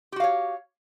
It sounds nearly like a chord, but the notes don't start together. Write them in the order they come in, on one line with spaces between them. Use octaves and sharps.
G4 F#4 F5 C#5